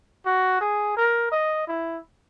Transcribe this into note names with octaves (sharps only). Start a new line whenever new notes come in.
F#4
G#4
A#4
D#5
E4